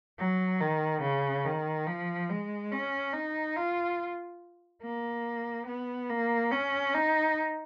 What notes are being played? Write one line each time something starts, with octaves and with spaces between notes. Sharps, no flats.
F#3
D#3
C#3
D#3
F3
G#3
C#4
D#4
F4
A#3
B3
A#3
C#4
D#4